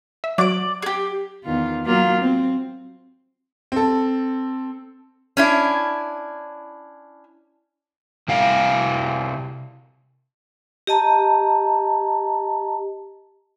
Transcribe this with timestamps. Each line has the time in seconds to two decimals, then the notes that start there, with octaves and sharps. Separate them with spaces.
0.24 E5
0.38 F#3 D5 D7
0.82 G4 G#4
1.45 E2 D#3 F4
1.85 F#3 A#3 F4
2.21 C4
3.72 C4 A4
5.37 C#4 D4 E4
8.28 C3 E4 F5 G#5
10.87 G4 D#5 A5 A#5